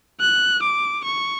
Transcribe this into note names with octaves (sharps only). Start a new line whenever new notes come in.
F#6
D6
C#6